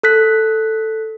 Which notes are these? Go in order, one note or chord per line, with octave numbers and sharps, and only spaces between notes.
A4 F#6 B6